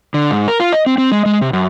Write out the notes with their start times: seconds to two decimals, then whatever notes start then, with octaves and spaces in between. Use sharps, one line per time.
0.14 D3
0.31 G#2
0.48 A#4
0.60 F4
0.73 D#5
0.86 C4
0.98 C4
1.12 G#3
1.26 G#3
1.41 C3
1.53 F#2